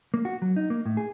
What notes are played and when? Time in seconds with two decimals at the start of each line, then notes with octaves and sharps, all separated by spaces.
0.14 A#3
0.25 F#4
0.42 F#3
0.56 D#4
0.70 A#3
0.86 A2
0.97 G#4